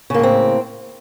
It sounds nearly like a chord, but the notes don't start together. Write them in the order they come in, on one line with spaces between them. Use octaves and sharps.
C#3 A#3 A2 C4